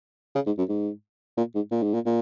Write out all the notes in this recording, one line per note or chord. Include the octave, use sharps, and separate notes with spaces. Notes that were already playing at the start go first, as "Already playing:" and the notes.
C#3
G#2
F#2
G#2
A#2
G#2
A#2
G#2
A#2
A#2